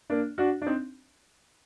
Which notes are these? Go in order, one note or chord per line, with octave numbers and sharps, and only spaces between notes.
A#3 D4
D4 F#4
D4
C4 D#4